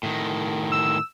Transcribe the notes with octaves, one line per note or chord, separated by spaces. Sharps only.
A2 D#3
E6